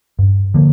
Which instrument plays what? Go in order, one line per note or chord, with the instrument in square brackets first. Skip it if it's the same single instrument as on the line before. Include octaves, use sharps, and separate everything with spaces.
[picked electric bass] G2
D3 F3 A#3